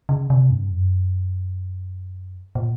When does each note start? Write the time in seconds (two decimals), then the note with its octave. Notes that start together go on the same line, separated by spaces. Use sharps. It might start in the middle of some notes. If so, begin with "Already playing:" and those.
0.09 C#3
0.30 C3
0.50 G2
0.70 F#2
2.55 A#2